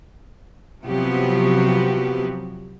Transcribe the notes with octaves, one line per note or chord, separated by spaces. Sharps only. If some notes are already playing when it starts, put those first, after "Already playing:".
C3 F3 F#3 B3 F#4 G4